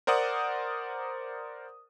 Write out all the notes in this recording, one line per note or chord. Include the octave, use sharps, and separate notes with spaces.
A#4 C5 D5 F#5 D#6